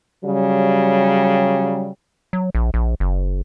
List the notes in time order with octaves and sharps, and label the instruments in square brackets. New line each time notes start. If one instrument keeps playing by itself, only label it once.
[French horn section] C#3 F#3 G3
[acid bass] F#3
A#1
A#1
F#1